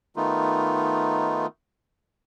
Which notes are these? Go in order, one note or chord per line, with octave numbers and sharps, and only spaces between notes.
D#3 A3 B3 D#4 F4